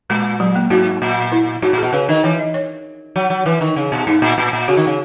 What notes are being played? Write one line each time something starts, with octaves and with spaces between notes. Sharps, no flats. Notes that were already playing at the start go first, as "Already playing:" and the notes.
A#2 G#3
F#3
A#3
G#2 F#4
A#2
E4
G#2 F#4
A#2
G#4
B2
C#3 B4
D#3 D#5
E3 C#5
D#5
C#5
F#3
F#3
E3 B4
D#3
C#3
B2
G#2 D#4
A#2
A#2
A#2
C#3 F#4
D#3
C#3